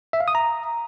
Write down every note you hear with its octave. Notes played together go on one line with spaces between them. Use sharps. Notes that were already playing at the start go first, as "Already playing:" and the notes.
E5
F5
D#6
A#5